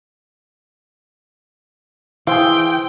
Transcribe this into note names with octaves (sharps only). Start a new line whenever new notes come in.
E3 E4 G#4 C5 F5 G5 C6